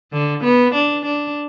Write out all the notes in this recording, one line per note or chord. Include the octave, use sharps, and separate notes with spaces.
D3
B3
D4
D4